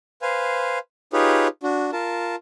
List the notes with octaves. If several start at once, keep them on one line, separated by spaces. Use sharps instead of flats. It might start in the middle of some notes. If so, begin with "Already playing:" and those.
B4 C5 F5 G#5
D#4 F4 G4 G#4 B4 C#5
D4 F#4
F4 A#4 A5